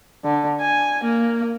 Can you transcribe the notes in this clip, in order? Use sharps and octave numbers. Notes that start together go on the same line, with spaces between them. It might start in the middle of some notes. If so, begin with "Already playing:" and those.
D3
G#5
A#3